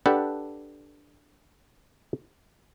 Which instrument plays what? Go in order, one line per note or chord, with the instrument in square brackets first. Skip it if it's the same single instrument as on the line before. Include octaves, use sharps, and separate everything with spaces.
[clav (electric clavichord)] D4 G4 A4 B4 F#5